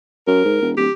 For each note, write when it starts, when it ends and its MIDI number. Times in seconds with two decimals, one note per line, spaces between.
0.27 0.44 42
0.27 0.70 70
0.45 0.61 44
0.62 0.74 28
0.77 0.87 26
0.77 0.92 67